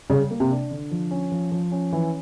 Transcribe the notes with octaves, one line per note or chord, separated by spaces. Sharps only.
C#3 G3
A#3
C3
D4
D3
F3
C#4
F3
F3
C#4
E3